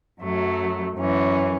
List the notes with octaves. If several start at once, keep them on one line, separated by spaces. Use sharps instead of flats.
F#2 F#3 A3
F#2 E3 C#4